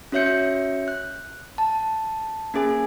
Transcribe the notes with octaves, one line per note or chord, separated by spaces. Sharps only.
C#4 F#4 C#5 E5 G6 C#7
F#6
A5
A#3 C#4 G#4 G#5